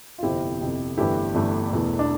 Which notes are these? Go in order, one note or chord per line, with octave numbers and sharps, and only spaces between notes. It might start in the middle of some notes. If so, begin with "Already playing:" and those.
F4
G1 F2 C3 E4 G4
G1 F2 C3
G1 G2 E3 A3 E4 G4
G1 G2 E3 A3
E1 E2 E3 A3
D4